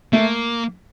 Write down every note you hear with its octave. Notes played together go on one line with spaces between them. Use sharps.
A3 A#3